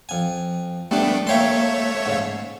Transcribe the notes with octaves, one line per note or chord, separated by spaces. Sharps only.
F2 G#5
G3 A3 B3 D4
A3 A#3 C#5 E5 G5 C6
G#2 C#3